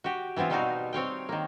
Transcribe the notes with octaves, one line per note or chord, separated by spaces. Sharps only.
F#4 G4
E3 B3 C4 E4 F4
B2 G3 C4 D#4 F#4 F5
C4 C#5 F5 G5
D#3 A#3